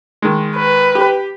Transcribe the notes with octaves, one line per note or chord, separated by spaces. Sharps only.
D#3 G#3
B4
G4